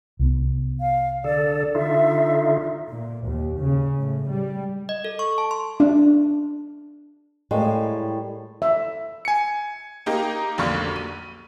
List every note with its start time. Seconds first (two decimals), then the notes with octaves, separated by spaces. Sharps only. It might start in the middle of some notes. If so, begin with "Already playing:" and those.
0.19 C2 B3
0.81 F5
1.24 D3 A4 D5
1.75 D3 D#4 F4 E5
2.89 A#2
3.27 D#2
3.60 C#3
4.01 A2
4.30 G3
4.89 D#5
5.05 A4
5.19 C#6
5.38 A5
5.51 C6
5.80 D4
7.51 A2 G3 G#3 A#3
8.62 E5
9.25 G#5 C#7
10.06 A#3 D#4 G4 A#4
10.58 F1 B1 D3 A#3 C#6 F6
10.96 D#7